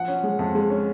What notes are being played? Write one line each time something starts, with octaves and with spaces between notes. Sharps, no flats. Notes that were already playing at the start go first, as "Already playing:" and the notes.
Already playing: F3 F#5
C#4
G#3
F2
G#3
C#4